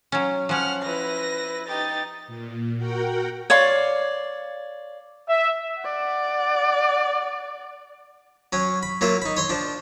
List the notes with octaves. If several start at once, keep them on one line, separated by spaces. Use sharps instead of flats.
F#3 C#4
F3 C#4 F#5 F6
E4 B4 A#6
D#4 G4 A6
A#2
F#4 A#4 F#5 G5
C#5 D5 F5 C6
E5
D5 F#5
F#3 C#4
B5
F#3 A#3 F4 E5
D#4 B5
C#5 C6 C#6
F3 D4